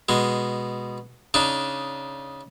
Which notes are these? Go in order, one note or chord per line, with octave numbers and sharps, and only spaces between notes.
B2 G#3
C#3 D4 D#4